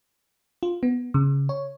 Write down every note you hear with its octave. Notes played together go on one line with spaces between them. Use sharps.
F4
B3
C#3
C#5